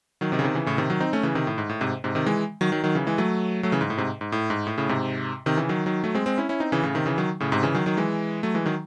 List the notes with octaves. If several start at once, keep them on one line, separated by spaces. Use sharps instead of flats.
D#3 F#3
C3 D#3
C#3
C3 D#3
C#3 E3
A2 C#3
C3 D#3
D#3 F#3
C4 D#4
A3 C#4
C#3 E3
C3 D#3
A2
G#2
A2
G#2 C3
G#2 C3
C3 D#3
E3 G#3
D#3 F#3
D#3 F#3
D#3 F#3
C#3 E3
E3 G#3
F#3 A3
F#3 A3
C#3 E3
G#2
A2
G#2 C3
G#2
A2
G#2
A2
A2 C#3
G#2 C3
C3 D#3
C#3 E3
D#3 F#3
D#3 F#3
F#3 A3
G#3 C4
G#3 C4
C#4 E4
C#4 E4
C4 D#4
C#3 E3
A2 C#3
C3 D#3
C#3 E3
D#3 F#3
A2 C#3
G#2 C3
C#3 E3
D#3 F#3
D#3 F#3
E3 G#3
F#3 A3
E3 G#3
D#3 F#3